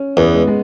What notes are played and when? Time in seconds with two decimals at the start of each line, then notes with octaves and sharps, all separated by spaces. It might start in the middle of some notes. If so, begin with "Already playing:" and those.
Already playing: C#4
0.17 E2 B3
0.34 G#3
0.47 G#3